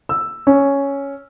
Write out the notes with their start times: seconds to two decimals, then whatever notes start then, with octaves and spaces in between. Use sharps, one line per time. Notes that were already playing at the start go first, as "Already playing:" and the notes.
0.09 E6
0.47 C#4